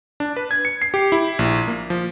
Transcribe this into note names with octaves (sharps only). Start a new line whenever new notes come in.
D4
B4
G#6
C#7
C7
G4
E4
A#1
A#3
F3